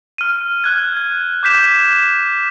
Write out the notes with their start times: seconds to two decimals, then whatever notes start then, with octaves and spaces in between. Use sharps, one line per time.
0.18 F6 D#7
0.64 F6 F#6 G#6
0.97 G#6
1.43 D6 G6 B6 E7